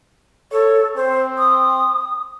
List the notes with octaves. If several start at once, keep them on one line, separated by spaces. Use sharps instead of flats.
A4 C#5
C4 C5
D#6